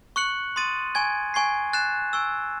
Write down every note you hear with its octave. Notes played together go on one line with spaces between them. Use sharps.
C#6 F#6 C#7 F#7
C6 D#6 A6 D#7
G#5 C#6 G#6
G#5 C#6 G#6 C7
F#6 A6 C7 E7
G#5 C#6 E6